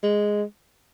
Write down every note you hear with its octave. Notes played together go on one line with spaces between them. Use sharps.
G#3